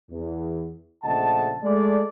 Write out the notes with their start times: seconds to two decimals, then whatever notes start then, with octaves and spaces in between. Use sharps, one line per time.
0.12 E2
1.04 A#1 C#3 A3 D#5 F#5 A5
1.63 G#3 A3 D5